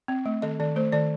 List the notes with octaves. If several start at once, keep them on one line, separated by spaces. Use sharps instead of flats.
C4
A3
D#3 D#5
D#3 D5
A3 C5
D#3 D5